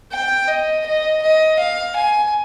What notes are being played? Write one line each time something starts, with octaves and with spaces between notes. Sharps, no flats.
G5
D#5
D#5
D#5
F5
G#5